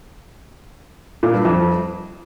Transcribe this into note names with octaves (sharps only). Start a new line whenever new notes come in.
A#2
G2
F2